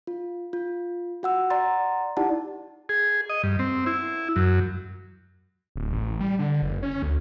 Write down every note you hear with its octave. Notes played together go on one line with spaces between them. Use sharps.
F4
F4
F#4 F#5 E6
D5 F#5 A#5 C6 A6
D#4 E4 G4 D5 F#5 A5
G#4
D#5
G2
C4
E4
F#2
D1
A1
G3
D3
F#1
C#4
D2